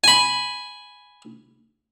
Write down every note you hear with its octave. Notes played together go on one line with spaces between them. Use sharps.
G#5 B5